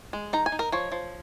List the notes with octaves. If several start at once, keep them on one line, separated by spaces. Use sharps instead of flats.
G#3
D#4 A#5
G#5
D#4
A#4
F3 C#5
F3